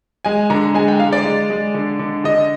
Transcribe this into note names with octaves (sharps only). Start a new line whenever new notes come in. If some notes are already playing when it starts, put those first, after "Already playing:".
G#3 G#5
D3 A#5
G#3 G#5
G5
G#3 F5
D5
G#3
G#3
D3
D3
D3 D#5